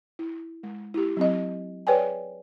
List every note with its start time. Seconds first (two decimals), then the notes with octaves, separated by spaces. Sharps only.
0.19 E4
0.63 G#3
0.94 E4 G4
1.17 F#3 C4 D#5
1.87 G#4 B4 C#5 D5 G5 G#5